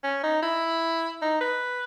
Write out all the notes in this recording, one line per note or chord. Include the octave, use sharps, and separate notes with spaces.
C#4
D#4
E4
D#4
B4